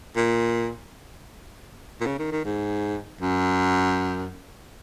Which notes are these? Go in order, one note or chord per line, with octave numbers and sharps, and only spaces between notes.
A#2
A#2
C#3
D#3
D#3
G#2
F#2